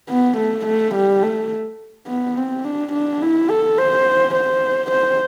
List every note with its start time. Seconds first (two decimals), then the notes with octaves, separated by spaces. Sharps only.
0.09 B3
0.38 A3
0.66 A3
0.95 G3
1.23 A3
2.08 B3
2.37 C4
2.65 D4
2.93 D4
3.22 E4
3.50 A4
3.78 C5
4.35 C5
4.91 C5